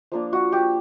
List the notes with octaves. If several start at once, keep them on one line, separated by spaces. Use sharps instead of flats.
F3 A#3 D4
F#4
G4